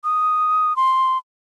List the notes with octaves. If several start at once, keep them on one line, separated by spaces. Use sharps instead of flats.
D#6
C6